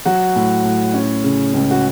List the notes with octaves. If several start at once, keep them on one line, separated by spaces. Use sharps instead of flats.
F#3 F#4
A2
A2
C#4
C#3
C#2
F#4